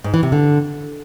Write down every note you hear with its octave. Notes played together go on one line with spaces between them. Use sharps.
G#2
E3
C3
D3